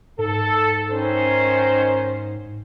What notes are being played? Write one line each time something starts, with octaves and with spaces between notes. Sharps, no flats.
G#2 A4
D#3 C#4 C5